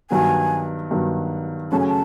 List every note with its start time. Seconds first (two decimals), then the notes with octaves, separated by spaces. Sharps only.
0.10 G2 D#3 F#3 B3 G#5
0.91 G2 D#3 F#3 B3
1.72 F#2 C#3 F#3 A3 C#4 A5
1.80 G#5
1.88 A5